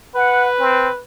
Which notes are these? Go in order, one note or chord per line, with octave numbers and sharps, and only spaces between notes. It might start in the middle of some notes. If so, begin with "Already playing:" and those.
B4 F#5
C4